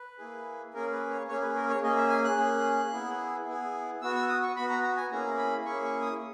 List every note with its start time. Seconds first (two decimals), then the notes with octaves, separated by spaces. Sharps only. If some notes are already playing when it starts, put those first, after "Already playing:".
Already playing: B4
0.18 A#3 E4 G#4
0.74 A#3 C#4 G#4 A#4
0.92 B4
1.10 C#5
1.28 A#3 C#4 G#4 C#5
1.41 B4
1.56 A#4
1.70 C#5
1.82 A#3 C#4 G#4 D#5
1.96 E5
2.09 G#5
2.24 F#6
2.37 A#3 C#4 G#4
2.92 B3 E4 G#4
3.47 B3 E4 G#4
4.02 B3 F#4 E6
4.15 E6
4.29 D#6
4.43 C#6
4.56 B3 F#4 B5
4.70 A#5
4.83 A#5
4.97 G#5
5.10 A#3 C#4 E4 G#4 A#5
5.38 B5
5.65 A#3 C#4 E4 G#4 C#6
5.84 C#6
6.02 D#6